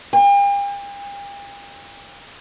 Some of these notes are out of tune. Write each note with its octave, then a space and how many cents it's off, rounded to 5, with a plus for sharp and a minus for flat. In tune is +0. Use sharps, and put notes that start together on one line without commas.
G5 +45